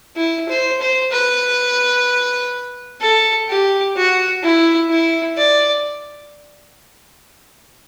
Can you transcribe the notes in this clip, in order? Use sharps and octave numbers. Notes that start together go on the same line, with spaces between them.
E4
C5
C5
B4
A4
G4
F#4
E4
E4
D5